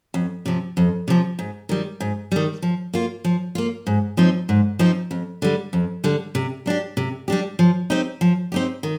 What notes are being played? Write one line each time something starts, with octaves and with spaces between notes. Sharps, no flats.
F2
C3 F3
F2
C3 F3
G#2
D#3 G3
G#2
D#3 G3
F3
A#3 F4
F3
A#3 F4
G#2
F3 C4 D#4
G#2
F3 C4 D#4
F2
D3 G3
F2
D3 G3
C3
G3 D4 G4
C3
G3 D4 G4
F3
C4 D#4 G4
F3
C4 D#4 G4
D#3